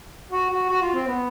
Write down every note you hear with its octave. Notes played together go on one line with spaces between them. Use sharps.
F#4
F#4
F#4
F4
C4
B3